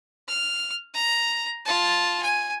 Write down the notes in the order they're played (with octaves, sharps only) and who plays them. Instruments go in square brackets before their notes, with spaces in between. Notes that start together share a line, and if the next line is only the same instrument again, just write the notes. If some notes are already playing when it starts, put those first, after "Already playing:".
[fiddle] F6
A#5
F4 A5
G#5